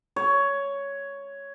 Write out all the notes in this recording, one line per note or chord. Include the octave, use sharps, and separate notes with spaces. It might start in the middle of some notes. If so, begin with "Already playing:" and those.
C#5